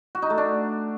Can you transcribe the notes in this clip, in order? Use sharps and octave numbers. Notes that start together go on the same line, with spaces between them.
F#4
D#4
A3
D4